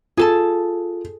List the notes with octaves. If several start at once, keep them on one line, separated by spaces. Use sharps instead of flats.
F4 G#4 A4 A5